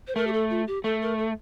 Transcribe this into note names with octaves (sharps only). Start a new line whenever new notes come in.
C5
A3 A#4
G4
A4
F4
G4
A3 A4
A#4
A4